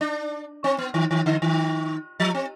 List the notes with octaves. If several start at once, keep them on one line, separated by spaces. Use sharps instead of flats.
D4
C4
B3
D#3
D#3
D3
D#3
F3
C4